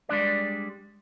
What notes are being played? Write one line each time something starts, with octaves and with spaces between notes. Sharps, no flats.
G3 G#3 D4 D5